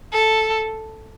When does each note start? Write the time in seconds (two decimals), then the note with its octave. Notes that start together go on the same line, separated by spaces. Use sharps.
0.13 A4